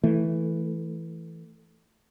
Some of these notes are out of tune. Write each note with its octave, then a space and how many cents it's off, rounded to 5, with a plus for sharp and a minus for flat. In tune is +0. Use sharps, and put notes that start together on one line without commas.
E3 +0 A3 +0